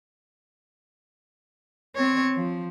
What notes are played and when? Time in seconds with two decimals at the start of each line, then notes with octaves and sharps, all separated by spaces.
1.95 C4 C#5
2.35 F3